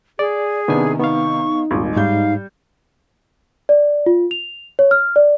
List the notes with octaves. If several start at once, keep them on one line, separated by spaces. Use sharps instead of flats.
G#4 D5
C3 D#3 B3 D4 G#5
B3 D#4 F5 C#6
D#1 G#1
G#2 G3 F5 G6
D5
F4
F7
C#5
F6
D5